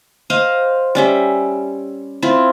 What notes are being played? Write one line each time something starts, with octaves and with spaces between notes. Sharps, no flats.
C5 D#5 F5
G3 C#4 E5
C4 E4 F4